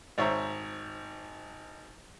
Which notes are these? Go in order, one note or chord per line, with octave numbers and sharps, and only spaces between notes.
G#1 C5 C#5 E5 A#5